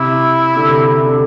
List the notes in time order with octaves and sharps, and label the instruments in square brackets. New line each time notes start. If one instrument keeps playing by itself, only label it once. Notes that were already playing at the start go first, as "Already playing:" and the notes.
Already playing: [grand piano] C3 [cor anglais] E4
[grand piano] D3
C3
C3
D3